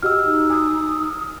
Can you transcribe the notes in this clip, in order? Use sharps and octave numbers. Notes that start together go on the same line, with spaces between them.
F#4 G4 D#5 E6 F6
D#4
G#5 D#6